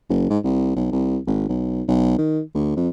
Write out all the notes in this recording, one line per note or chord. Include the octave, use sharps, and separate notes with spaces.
F#1
G#2
C2
B1
C2
G#1
B1
B1
D#3
D2
F2